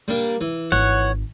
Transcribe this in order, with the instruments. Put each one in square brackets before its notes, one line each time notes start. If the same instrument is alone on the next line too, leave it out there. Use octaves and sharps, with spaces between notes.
[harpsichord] G3 A#3 D4
E3
[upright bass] G#1 [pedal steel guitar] C#5 F#5